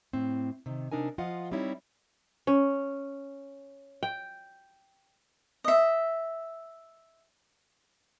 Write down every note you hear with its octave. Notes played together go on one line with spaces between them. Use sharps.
A2 C4
C3 D#3
C3 D4 D#4 A#4 G#5
F3 F4 D#5 F5 F#5
G3 C4 D#4 E4 C#5
C#4
G5
D#5 E5